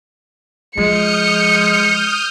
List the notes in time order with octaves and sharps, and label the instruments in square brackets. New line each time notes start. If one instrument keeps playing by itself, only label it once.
[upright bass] F3 [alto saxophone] G#3 [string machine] D#6 F6 G6 [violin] C#7